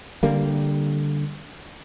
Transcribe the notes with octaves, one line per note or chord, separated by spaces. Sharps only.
D3 G3 A#3